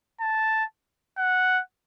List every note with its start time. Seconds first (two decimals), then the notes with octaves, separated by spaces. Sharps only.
0.21 A5
1.17 F#5